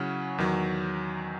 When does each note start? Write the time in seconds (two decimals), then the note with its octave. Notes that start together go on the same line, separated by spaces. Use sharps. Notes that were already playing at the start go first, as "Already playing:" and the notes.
Already playing: C#3 F#3 C#4 E4 F#5
0.38 E2 D#3 F#3